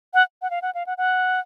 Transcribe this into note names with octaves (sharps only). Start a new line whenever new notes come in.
F#5
F#5
F5
F#5
F5
F#5
F#5